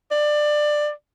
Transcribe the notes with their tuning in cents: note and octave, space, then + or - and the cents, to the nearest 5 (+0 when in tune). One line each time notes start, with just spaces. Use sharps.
D5 +20